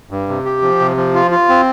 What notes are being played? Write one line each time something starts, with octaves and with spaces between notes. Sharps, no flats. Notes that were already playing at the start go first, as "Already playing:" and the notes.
G2
C3
G4
F3
C3
F3
F4
F4
C4